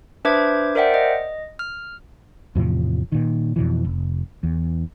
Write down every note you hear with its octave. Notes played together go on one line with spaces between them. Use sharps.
D4 B4 C5 E5 D6 G#6
A#4 C5 D5 E5 F#5 G5
D#5
F6
E2 A2 C3 F3
A#2 D#3
F2 B2 E3
F1
E2